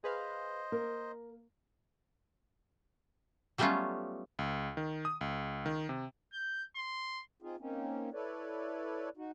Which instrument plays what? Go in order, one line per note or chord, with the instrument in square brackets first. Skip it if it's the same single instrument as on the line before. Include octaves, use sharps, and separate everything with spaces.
[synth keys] G#4 B4 F5 [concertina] C5 D#5
[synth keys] A#3 [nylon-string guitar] A#4
[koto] F#3 G3 A3 B3 C#4 F4
[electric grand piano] C#2
D#3
D#6
C#2
D#3
C3
[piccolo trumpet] G6
C6
[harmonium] C4 D#4 F4 G#4
A#3 C4 C#4 D#4
E4 A4 B4 C#5 D5
D#4 F#4